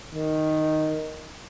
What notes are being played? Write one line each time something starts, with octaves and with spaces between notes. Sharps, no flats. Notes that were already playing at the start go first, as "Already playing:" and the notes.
D#3